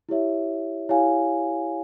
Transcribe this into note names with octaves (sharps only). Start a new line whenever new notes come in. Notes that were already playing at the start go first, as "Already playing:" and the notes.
E4 G4 C#5 E5
E4 G4 C#5 F5 G#5